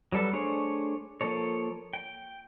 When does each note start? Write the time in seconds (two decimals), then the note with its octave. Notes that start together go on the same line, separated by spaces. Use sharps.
0.12 F#3 G3 A4 B4 A5
0.33 A3 D4 G#4 C5 C#5
1.21 F3 A#3 A4 C#5
1.93 G5